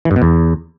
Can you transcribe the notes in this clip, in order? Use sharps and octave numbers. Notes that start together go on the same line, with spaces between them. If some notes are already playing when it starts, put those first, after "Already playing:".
E3
G2
B2
E2